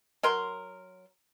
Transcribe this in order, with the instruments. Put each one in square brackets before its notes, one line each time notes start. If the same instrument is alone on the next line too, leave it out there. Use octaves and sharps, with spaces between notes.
[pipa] F#3 A#4 C6